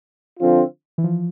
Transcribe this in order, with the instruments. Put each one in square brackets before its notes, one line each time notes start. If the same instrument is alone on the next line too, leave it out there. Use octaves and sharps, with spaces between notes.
[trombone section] D3 F3 C4 F4
[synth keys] E3
F3